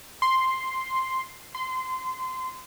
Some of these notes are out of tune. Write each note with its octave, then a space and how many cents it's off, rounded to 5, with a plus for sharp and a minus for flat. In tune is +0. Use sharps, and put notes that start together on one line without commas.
C6 +0
C6 -20